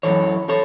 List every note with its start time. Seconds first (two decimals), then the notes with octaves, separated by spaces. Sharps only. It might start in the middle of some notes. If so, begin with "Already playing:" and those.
0.03 F#2 C#3 E3 A4 C#5
0.49 A4 C#5